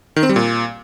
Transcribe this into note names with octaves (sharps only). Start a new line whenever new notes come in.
D#3
C4
G3
A#2